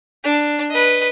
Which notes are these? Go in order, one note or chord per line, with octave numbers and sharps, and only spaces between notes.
D4
B4 D#5